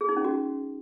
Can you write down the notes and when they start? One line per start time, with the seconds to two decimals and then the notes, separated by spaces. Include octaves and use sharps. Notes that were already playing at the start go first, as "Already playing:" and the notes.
0.01 G#4
0.09 D#4
0.17 C#4
0.25 F#4